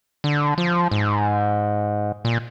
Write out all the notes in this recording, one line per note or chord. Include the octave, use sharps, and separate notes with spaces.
D3
F3
G#2
A#2